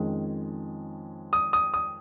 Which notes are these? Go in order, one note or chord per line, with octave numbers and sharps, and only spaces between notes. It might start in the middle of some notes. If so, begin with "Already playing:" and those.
Already playing: F2 D#3 G#3 C#4
D#6
D#6
D#6